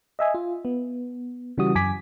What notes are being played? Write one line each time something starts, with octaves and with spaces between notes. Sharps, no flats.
D#5 E5 G#5
F4
B3
C#3 E3 G3 F#4 D#6
F#2 G#5 D6 B6